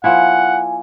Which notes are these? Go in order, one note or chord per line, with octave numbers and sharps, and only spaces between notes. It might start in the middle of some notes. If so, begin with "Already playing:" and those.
F3 A#3 E4 F#5 G#5